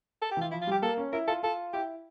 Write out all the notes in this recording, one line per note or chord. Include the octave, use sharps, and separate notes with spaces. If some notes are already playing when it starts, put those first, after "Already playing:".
A4
G4
E3 F4
F3 E4
F4
G3 G4
A#3 A4
C#4
E4 A#4
F4 A4
F4 A4
E4 G4